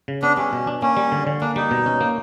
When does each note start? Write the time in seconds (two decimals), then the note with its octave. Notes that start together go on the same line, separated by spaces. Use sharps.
0.08 C#3
0.22 B3 D4
0.37 G3 C#4
0.53 B2
0.67 D4
0.82 A#3 C#4
0.97 G3
1.12 D3
1.27 D3
1.41 A#3 D4
1.56 G3 D#4
1.71 B2
1.86 C#4
2.01 A#3